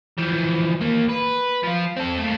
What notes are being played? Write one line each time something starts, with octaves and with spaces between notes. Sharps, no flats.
E3 F3
D#2 A#3
B4
F3 F4
C4 A4
A3 A#3